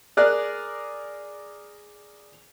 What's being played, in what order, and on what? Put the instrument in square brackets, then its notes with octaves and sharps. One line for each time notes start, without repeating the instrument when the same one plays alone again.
[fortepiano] G#4 A#4 D5 F#6